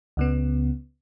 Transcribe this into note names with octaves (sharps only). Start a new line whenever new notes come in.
C#2 C#3 B3